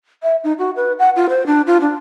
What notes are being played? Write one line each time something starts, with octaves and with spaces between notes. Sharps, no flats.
E5
D#4
F#4
B4
F#5
F4
C5
D4
F4
D4